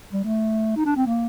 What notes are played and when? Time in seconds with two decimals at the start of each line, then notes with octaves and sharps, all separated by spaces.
0.13 G3
0.24 A3
0.76 D#4
0.85 D4
0.96 C4
1.06 A#3